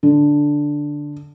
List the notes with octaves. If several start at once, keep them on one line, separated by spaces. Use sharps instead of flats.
D3